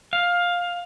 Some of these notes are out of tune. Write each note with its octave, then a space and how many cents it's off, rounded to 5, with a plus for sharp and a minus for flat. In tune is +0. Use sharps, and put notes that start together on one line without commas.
F5 +15